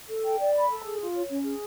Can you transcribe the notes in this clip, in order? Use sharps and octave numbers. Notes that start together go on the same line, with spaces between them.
A4
G5
D5
B5
A4
G#4
F4
C#5
C#4
G#4